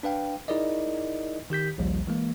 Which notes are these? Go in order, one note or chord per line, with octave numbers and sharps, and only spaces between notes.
D4 B4 F5 G5
D#4 E4 G#4 A#4 D5 D#5
D#3 G4 G6 B6
A#1 D#2 F3 G3
E3 G#3 A#3